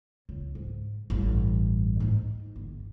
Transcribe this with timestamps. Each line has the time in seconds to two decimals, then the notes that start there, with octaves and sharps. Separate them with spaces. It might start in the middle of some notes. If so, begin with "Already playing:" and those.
0.29 C#2
0.55 G#2
1.10 A1 G2
2.00 G#2 D#4
2.56 G1